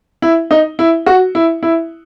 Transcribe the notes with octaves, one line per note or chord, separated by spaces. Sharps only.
E4
D#4
E4
F#4
E4
E4